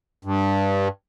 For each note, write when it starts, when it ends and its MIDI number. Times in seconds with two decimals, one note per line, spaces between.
0.25 0.88 43